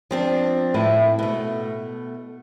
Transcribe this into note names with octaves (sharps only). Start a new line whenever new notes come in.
F3 C4 D4
A2 E4 B4
B2 A3